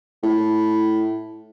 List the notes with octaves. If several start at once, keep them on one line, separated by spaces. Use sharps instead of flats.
A2